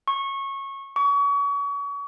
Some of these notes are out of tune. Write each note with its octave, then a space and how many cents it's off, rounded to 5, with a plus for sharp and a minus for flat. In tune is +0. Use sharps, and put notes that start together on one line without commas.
C#6 -20
C#6 +35